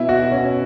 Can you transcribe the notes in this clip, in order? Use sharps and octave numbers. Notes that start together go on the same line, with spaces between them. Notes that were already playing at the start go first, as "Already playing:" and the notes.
Already playing: B2 E4
F#4
C#4